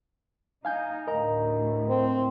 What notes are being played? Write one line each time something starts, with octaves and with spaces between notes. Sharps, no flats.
D#4 F5 G#5 G6
D2 A2 A#4 D#5 A#5
C4